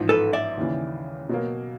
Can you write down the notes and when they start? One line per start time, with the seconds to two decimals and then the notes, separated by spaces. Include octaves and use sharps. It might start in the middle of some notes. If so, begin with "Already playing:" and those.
Already playing: A1 G#2 F3
0.09 A4 B4
0.33 D5 E5
0.58 D#2 C#3 E3
1.29 B2 F#3 A#3